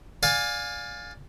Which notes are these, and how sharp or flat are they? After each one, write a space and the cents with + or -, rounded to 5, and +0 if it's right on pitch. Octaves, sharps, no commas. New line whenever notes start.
D5 +0 F5 +25 G#5 +0